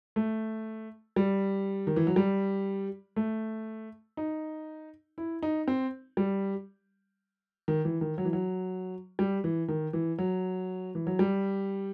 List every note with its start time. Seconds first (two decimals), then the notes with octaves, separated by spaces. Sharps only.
0.16 A3
1.16 G3
1.87 D#3
1.96 E3
2.07 F#3
2.16 G3
3.16 A3
4.17 D#4
5.18 E4
5.42 D#4
5.68 C4
6.17 G3
7.68 D#3
7.85 E3
8.01 D#3
8.18 F#3
8.25 E3
8.33 F#3
9.19 G3
9.44 E3
9.68 D#3
9.93 E3
10.18 F#3
10.95 E3
11.07 F#3
11.19 G3